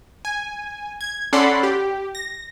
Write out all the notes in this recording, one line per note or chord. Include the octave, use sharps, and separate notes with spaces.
G#5
G#6
C#4 A4 D5 F#5 B5 C6
G4
A#6